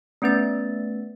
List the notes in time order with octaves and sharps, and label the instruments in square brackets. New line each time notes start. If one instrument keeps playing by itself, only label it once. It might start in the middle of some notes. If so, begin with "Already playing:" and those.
[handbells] A3 B3 C#4 B4 A6